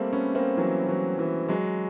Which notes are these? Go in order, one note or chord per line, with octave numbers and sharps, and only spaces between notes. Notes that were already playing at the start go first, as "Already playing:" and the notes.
Already playing: G3 A3 A#3 C4
B3 C#4
A#3 C4
E3 F#3
E3 F#3
E3 F#3
F#3 G#3